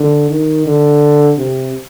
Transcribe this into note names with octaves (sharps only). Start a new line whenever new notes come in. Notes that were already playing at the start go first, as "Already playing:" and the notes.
Already playing: D3
D#3
D3
C3